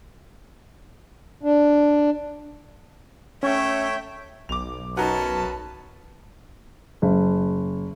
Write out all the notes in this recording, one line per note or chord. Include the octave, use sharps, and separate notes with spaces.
D4
A3 C#4 C#5 E5 G5 C#6
B1 D6 F7
F#2 C#4 D#4 F#4 B4 A5
F#1